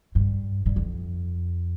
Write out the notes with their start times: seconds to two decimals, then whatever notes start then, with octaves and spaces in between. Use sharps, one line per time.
0.15 G2
0.66 G2
0.76 F2